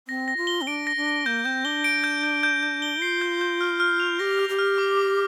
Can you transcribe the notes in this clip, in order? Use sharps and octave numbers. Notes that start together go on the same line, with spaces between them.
C4 A#6
A#6
F4
G7
C4
D4 D7
A#6
D4
A#6
A#3 G6
C4 G6
D4 G7
D7
G6
G6
G6
G6
G7
F4 C7
G6
G6
F6
F6
F7
G4 A#6
F6
G4
F6
D6
D6